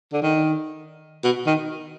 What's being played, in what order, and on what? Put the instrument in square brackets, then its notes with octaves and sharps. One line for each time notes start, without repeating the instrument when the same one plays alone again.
[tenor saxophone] D3
D#3
B2
D#3